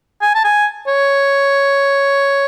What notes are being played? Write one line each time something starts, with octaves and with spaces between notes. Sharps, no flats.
G#5
A5
G#5
C#5